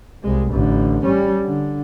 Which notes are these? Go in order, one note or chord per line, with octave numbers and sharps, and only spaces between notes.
C2 G#3
A1 D3
G3 C#4
D3